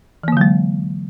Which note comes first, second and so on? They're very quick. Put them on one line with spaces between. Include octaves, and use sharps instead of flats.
E3 A#3 D3 F#3 G#3